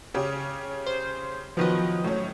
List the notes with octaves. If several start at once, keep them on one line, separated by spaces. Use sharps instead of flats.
C#3 C#4 G4
C5
D#3 F3 F#3 B3 B4 D#5
A2 F#3 C#4